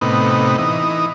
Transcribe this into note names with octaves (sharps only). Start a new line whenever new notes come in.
A2 C3 B3 D#4
E3 D#4